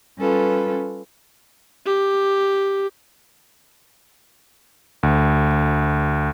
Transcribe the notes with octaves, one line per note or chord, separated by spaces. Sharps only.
G3 C#4 F4 A4 B4
G4
D2